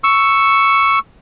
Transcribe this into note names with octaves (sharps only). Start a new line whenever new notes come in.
C#6 E6